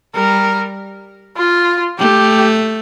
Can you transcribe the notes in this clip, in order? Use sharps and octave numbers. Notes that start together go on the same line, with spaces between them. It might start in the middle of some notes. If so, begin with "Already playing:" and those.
G3 A#4
F4
A3 G4